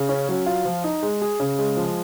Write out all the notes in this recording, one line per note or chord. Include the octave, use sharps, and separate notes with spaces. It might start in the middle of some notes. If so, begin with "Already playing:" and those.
Already playing: C#3
C#4
F#3
F4
F3
D#4
G#3
G#4
C#3
G#3
F3